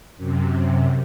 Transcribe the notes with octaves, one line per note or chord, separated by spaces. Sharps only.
F#2 C3